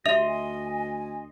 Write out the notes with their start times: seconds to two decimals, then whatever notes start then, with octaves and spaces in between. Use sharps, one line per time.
0.06 D2 G4 D#5 E5 C6 F7
0.28 G#5